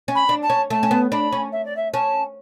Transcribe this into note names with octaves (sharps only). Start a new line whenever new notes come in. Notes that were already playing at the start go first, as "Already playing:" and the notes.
C#4
B5
D4
A5
C#4
A3 A5
C#4
B3
D4 B5
C#4
E5
D5
E5
C#4 A5